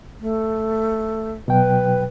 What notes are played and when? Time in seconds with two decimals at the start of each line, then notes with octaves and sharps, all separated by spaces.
0.20 A3
1.48 B2 F#3 B4 G5